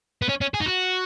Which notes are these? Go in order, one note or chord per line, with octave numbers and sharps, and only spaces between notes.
B3
C#4
C#4
G#4
D#4
F#4